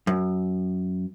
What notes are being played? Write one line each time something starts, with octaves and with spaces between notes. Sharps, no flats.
F#2